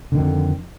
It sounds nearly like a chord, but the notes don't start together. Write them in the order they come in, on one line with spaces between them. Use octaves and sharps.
D3 D#3 F2